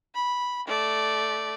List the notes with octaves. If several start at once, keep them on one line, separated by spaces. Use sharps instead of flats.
B5
A3 D5